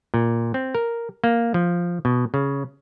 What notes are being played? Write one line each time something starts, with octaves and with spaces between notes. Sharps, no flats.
A#2
C4
A#4
A#3
F3
B2
C#3